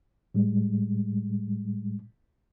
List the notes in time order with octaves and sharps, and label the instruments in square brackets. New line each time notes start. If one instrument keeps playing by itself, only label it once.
[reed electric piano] A2 G3 G#3